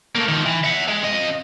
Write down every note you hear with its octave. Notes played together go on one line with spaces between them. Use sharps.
A3 A#3
D#3 F3
E3
E5 F#5
G#3
F2 D#5